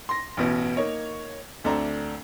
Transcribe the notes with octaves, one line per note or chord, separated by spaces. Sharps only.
C6 A#6
A1 B2 B3
A#3 D#4 C#5
D2 A3 C4 D4 A#5